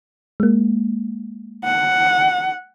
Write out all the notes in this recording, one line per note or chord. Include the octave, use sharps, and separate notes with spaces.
G#3 A#3
F#5